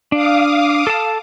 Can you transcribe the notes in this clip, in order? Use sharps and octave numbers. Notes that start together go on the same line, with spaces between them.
D4 F5 D6 D#6
A4 A5